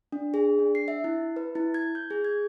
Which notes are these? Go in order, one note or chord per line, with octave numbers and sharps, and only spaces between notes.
D4
G#4
D4
C7
E5
E4
B4
E4
G#6
G6
G#4
G#6